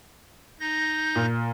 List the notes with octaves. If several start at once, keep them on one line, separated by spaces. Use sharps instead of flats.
D#4 G6 A#6
A#2